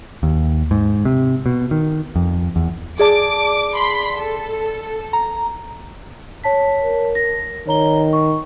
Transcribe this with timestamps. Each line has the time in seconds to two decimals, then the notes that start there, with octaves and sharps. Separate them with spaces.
0.23 D#2
0.71 G#2
1.05 C3
1.46 B2
1.71 D#3
2.16 F2
2.56 E2
2.99 G#4 D5 A5 D6
3.76 B5 C6 B6
4.18 A4
5.13 A#5
6.44 C#5 A5 B6
6.84 A#4
7.15 A#6
7.67 D#3 C#5 A#5 G7
8.13 C#6